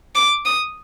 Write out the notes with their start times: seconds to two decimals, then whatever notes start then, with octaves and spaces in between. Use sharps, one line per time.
0.15 D6
0.46 D#6